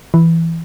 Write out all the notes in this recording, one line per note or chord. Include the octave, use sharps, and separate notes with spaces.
E3